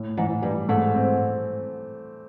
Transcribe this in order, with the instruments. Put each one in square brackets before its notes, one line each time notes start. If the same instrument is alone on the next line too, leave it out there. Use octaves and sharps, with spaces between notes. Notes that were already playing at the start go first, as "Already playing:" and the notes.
Already playing: [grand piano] A2
[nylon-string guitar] G#2 [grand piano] E3
[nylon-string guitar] G2 [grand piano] G3
[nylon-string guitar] G#2 [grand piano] A3
[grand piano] C4